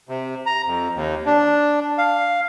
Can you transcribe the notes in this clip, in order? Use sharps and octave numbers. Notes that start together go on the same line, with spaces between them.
C3
A#5
F2
D#2
D4
F5